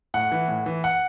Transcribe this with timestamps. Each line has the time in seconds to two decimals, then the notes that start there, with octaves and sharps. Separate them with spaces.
0.14 A2 F#5
0.32 E3
0.48 A2
0.66 E3
0.84 F#5